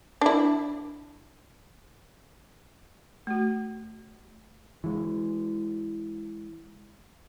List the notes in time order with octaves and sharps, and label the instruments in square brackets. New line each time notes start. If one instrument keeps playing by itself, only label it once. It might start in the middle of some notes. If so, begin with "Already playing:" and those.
[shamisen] D4 E4
[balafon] A3 F#4
[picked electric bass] E3 G#3